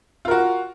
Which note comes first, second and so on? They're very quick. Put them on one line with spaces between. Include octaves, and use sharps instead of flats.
F4 A#4 F#4